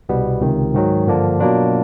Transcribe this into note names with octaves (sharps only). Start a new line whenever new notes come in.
C2 B2 G3 B3
C#2 C3 D#3
G#2 D#3 F#3
G2 D3 F3 A#3 D4
B2 F#3 A#3 D4 F4